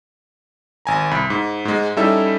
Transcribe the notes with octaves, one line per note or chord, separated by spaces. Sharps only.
G#1 G#5 A#5
C2 B5
G#2
G#2 G#3
G3 C#4 D#4 E4 A4 E5